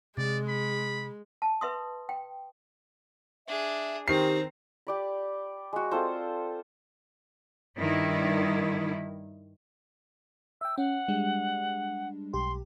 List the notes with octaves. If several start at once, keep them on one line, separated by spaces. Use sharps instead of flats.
C3 G#3 D5
B5
A5
B4 E5 C6 D#6
G5
D4 G#4 E5
D#3 C4 G4 C5 A#5 C7
G4 D5 B5
G#3 F#4
C4 F4 A4 C5
G2 D#3 E4
E5 G5 E6
C#4 F#5
G3 G#3 D4
B1 G4 C6